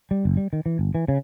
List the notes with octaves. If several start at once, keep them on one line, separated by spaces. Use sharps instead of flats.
G3
F#1
G3
D#3
E3
G1
E3
C#3